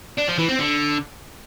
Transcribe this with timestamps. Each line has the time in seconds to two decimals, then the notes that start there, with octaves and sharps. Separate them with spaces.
0.18 D4
0.29 F3
0.39 E3
0.49 C4
0.59 D3